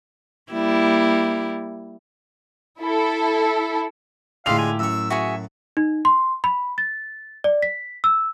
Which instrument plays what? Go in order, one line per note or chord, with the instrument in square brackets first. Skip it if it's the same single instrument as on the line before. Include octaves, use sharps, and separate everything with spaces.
[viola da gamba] G3 A#3 E4
[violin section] E4 A4
[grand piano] A2 F7 [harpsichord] D3 G#3 [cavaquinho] F4 G4 A4 [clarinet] F5
[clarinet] G#5
[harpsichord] F#2 C#6 [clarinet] E6
[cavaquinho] F#4 G#4 C#5 [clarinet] E5
[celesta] D#4
C6
B5
A6
D5
B6
E6